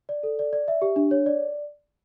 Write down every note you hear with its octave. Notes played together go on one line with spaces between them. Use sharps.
D5
A4
D5
D5
E5
G4
D4
C#5
D5